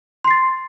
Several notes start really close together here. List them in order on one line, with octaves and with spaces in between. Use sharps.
C6 C7 A6